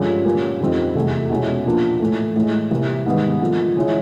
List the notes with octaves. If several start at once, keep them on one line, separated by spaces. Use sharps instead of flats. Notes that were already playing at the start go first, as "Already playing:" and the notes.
Already playing: G2 D3 F3 G#3 C#4
A#2 G3 A#3 C#4
F2 D3 G3 C4 D#4
E2 C3 E3 A3
B2 G#3 C#4 E4
A#2 F3 A#3 D4
A2 E3 A3
A2 E3 G#3
C3 E3 G3 A#3
G#2 D#3 G3 B3
D3 F3 A#3
C#3 E3 G#3 C#4 E4